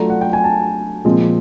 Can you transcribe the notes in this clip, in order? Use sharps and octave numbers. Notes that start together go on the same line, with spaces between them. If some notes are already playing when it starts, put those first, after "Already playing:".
Already playing: F#3 A3 D4 F4 A#5
F#5
G5
G#5
A5
A#2 F3 G#3 C4